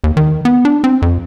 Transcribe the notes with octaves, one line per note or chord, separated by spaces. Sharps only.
D#2
D#3
B3
D4
C4
F2